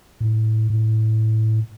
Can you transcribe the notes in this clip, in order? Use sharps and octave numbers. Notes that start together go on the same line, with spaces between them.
A2
A2